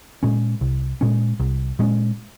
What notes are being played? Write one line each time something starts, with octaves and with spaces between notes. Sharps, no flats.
A#2 G#3 C#4
C2
A#2 G#3 C#4
C2
A#2 G#3 C#4